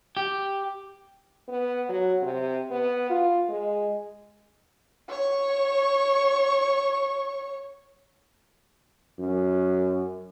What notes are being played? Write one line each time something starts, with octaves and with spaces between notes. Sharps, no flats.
G4
B3
F#3
C3
B3
F4
G#3
C#5 C#6
F#2